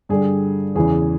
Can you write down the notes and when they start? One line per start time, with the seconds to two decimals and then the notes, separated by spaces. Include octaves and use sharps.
0.09 G2 D3 G3 G#4
0.75 E2 C#3 E3 G#4